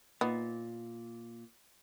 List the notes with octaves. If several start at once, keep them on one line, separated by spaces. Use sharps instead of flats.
A#2 B3 D#4